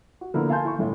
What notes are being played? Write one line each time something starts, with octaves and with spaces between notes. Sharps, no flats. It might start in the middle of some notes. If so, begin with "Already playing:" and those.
F#4
D3 F3 A#3 B3 E4 A#4
F5 G#5 A5 C6 G6
E4 C#6
G1 A2